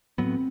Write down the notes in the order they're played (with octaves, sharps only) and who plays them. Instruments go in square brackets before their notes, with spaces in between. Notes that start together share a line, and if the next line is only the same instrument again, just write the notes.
[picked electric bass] A2 F#3 B3 [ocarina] C4